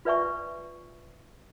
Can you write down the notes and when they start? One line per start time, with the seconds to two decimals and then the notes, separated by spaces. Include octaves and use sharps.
0.05 F4 B4 D5 E5 G#5 C#6